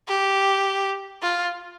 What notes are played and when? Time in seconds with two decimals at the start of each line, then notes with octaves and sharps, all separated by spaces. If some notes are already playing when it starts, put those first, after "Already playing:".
0.08 G4
1.22 F4